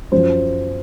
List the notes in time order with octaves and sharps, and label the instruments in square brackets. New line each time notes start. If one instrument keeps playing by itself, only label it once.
[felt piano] F#2 F3 C5